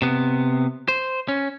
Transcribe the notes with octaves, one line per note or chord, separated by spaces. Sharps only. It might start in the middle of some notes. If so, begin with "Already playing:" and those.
C3 B3
C5
C#4